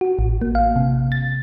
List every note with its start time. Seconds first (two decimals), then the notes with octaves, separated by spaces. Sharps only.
0.01 F#4
0.19 A1
0.41 A#3
0.55 F5
0.76 C3
1.12 A6